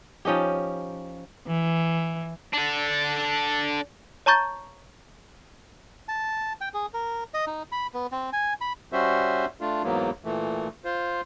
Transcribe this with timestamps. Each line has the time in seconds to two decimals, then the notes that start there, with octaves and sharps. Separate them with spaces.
0.25 F3 C#4 D#4 G4
1.47 E3
2.53 D4 A4
4.26 C#5 A5 A#5 C#6 G6 A6
6.08 A5
6.61 G5
6.74 G#4
6.94 A#4
7.34 D#5
7.47 D#4
7.72 B5
7.94 B3
8.12 C4
8.33 G#5
8.61 B5
8.93 G3 C#4 F#4 C5 E5
9.61 A3 D4 F4
9.83 E2 G#2 F#3 A#3 B3
10.25 A#2 E3 A3
10.85 F4 C5